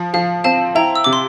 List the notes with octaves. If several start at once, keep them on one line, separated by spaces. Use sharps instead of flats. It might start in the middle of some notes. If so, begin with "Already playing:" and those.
Already playing: F3
F3 F5
C4 F5 A5
E4 G5 A#5
E6
C3 D6
C6